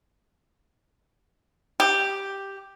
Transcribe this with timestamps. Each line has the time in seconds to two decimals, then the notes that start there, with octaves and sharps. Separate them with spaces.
1.80 G4